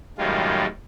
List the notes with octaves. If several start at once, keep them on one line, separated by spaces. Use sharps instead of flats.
F#2 A2 D#3 G3 G#3 F4